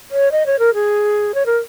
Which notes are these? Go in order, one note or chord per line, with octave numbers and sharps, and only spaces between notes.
C#5
D#5
C#5
A#4
G#4
C#5
A#4